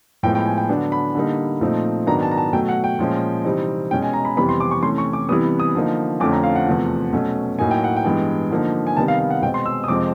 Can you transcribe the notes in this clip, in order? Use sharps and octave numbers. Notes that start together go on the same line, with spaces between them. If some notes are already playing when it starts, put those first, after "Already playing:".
A2 F3 G#3 B3 G5
G5
G#5
G5
D3 F#3 B3 D4
B5
D3 G3 A#3 D#4
A#2 F3 A3 C4 D#4
G#2 D#3 F#3 B3 D4 A#5
A5
A#5
A5
B2 F#3 A3 G5
F#5
G5
A#2 F3 G#3 C#4
C3 E3 G3 C4 D#4
B2 G#3 C#4 G5
G#5
A#5
B5
F2 C3 E3 G3 B3 B5
C6
D6
C#6
C3 E3 A3 C#4 C6
C#6
D6
C3 E3 G3 B3 D#6
D#6
D3 F3 A#3 D#4
F2 D3 F3 A3 C#4 D6
A#5
F5
F#5
E2 C3 F3 A3
B2 F#3 A3 C#4
A2 F#3 A#3 D#4 G#5
G5
F#5
G5
G2 E3 G#3 B3
D3 F3 A#3 D#4
G#5
C3 D#3 G3 B3 A5
F5
F5
F#5
B2 G#3 C4 G5
C6
E6
D#6
F2 C3 F3 G#3 C4 D6